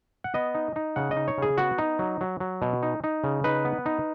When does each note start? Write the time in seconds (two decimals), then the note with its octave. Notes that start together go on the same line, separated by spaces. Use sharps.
0.24 F#5
0.34 B3 D#5
0.55 D#4
0.76 D#4
0.96 C#3 F#5
1.11 D#5
1.17 D#4
1.28 C#5
1.38 C#3 G#4
1.58 B3 F#4
1.78 D#4
1.99 F#3
2.21 F#3
2.40 F#3
2.62 B2
2.83 D#4
3.04 D#4
3.24 C#3
3.44 D#4 B4
3.65 B3
3.86 D#4